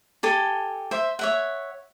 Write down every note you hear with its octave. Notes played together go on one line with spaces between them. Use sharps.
G4 A4 G#5
C5 E5
C#5 E5 F#5